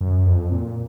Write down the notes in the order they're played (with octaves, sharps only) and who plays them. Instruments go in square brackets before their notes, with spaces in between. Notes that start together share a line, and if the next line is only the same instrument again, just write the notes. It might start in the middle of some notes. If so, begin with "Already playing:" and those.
[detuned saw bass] F#2
F2
A#2